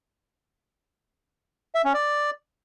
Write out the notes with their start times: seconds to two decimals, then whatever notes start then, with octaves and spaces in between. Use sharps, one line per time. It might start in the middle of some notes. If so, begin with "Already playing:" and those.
1.75 E5
1.84 C#4
1.94 D5